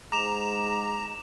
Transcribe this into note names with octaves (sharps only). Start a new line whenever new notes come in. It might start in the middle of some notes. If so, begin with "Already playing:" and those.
G#2 G#3 A#5 D6 E7 F7